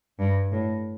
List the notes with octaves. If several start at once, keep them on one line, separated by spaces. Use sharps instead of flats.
G2
A2